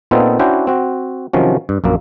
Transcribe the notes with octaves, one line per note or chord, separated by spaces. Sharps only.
A#2 B3 C4 D#4 F4 A4
C#4 D4 E4 F#4 C5 G5
C4 F#4
C3 D#3 F3 F#3 C#4
G2
A#1 F#2 A#3